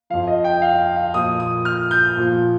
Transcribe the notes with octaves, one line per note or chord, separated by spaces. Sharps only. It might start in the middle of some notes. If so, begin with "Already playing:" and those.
F2 F3 F5
D#5
G5
F5
F5
A#2 F3 D#6
D#6
F6
G6
A#2 F3